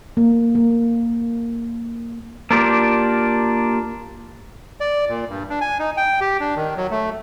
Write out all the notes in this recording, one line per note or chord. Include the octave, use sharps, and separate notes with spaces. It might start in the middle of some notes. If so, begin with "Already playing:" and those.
A#3
A#3
A#3 D4 F4 G4
D5
A#2
G2
D4
G#5
D#4
G5
G4
D4
D#3
F#3
A3